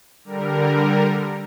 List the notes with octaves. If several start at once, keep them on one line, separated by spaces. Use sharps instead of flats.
D3 G3 A#4